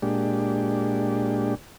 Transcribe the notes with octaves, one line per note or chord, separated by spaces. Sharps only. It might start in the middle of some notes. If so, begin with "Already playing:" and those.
A#2 G#3 D4 G4